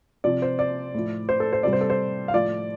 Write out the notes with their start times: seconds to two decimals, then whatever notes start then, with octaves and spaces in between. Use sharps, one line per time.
0.24 C3 F3 D5
0.42 C5
0.59 D5
0.94 A2 F3
1.29 C5
1.40 A4
1.53 C5
1.63 C3 G3 D5
1.73 C5
1.81 A4
1.90 C5
2.28 F5
2.34 A2 F3 D5